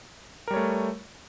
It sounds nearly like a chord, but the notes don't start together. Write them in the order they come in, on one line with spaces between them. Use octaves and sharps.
A#4 G3 C#5 A3